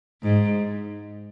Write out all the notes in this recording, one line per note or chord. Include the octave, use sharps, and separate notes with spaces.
G#2